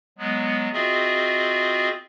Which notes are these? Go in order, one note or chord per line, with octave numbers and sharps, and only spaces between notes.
F#3 G#3 B3
C4 F4 F#4 G#4 D#5 E5